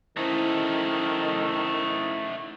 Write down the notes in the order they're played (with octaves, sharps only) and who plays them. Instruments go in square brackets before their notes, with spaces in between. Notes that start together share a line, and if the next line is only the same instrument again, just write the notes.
[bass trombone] D#3 [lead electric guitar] A3 D#4 [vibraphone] C#4 E4 C5